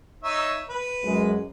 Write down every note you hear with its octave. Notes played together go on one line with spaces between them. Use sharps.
D#4 C#5 E5
B4
F#2 G#3